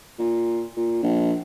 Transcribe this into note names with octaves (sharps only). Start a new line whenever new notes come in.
A#2
A#2
A#1